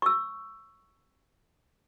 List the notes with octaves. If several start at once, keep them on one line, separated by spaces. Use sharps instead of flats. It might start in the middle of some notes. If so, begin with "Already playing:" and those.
C#6 E6